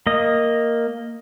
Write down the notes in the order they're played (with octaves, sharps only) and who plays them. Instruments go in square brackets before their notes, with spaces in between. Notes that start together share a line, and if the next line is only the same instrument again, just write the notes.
[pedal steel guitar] A#3 D#5